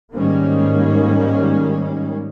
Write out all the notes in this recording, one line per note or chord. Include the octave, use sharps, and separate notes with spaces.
G#2 D#3 G3 G#3 A#3 C#4